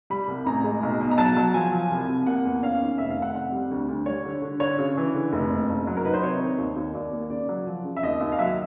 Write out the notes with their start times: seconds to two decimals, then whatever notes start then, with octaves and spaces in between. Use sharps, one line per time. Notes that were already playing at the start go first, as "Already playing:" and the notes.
0.10 G3 B5
0.28 C2
0.46 A1 A#5
0.64 G#3
0.83 B1
1.01 B2
1.11 A#5
1.18 F#3 A5
1.36 F#3
1.54 F3 G#5
1.72 F3
1.91 C2
2.08 C2
2.26 A#3 F#5
2.45 E2
2.63 C#4 F5
2.81 D#3
2.98 F1 E5
3.10 F5
3.17 F2
3.22 F#5
3.35 C4 F#5
3.52 G3
3.71 D2
3.88 D2
4.06 G3 C#5
4.25 D3
4.42 D3
4.60 D3 C#5
4.78 C#3
4.97 E3
5.14 D3
5.32 F1
5.50 F#1
5.69 F#1
5.87 F#3
5.97 A#4
6.05 D#4 B4
6.13 C5
6.23 C3 C#5
6.41 D#3
6.58 D#2
6.76 D#2
6.94 D#2 D5
7.13 A#3
7.30 C#3 D5
7.49 F#3
7.67 F3
7.84 C#3
7.97 E5
8.03 D#2 D#5
8.21 D#2
8.32 F5
8.38 F#3 E5